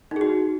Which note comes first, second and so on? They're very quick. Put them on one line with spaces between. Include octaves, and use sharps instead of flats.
D#4 G#4 F#4